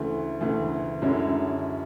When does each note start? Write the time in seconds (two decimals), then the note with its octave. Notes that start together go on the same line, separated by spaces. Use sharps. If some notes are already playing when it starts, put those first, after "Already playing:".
Already playing: D2 C#3 E3 A3
0.41 D2 C#3 E3 A3
1.02 F#2 D3 G#3 C#4 E4